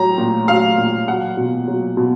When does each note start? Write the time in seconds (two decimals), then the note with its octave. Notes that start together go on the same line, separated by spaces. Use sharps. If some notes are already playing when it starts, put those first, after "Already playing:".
Already playing: A2 F#3 A#5
0.18 A#2
0.48 F#3 F5
0.78 A#2
1.08 F#3 F#5
1.37 B2
1.68 F#3
1.97 B2